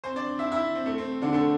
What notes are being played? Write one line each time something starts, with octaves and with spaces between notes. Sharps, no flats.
C4 C5
D4 D5
E4 E5
E4 E5
C4
A3
C4
D3 D4
A3 A4